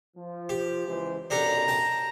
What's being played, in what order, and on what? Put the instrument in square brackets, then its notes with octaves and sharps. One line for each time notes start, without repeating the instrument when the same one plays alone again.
[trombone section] F3
[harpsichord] G4
[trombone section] C#2 E3 C5
[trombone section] B1 F#2 [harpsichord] D4 G4 A4 [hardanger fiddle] A#5
[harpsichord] G5 A5